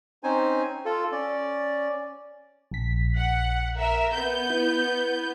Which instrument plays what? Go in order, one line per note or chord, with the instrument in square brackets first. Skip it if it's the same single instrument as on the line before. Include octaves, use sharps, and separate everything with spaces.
[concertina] C4 C#4 D#4 C5 G#5
F4 A4
C#4 D5
[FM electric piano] A#1 B6
[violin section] F#5
A#4 E5
B3 G6
[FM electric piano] E4